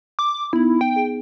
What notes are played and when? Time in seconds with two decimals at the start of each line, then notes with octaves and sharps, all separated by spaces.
0.19 D6
0.53 B3 D#4 E4
0.81 G5
0.96 G#4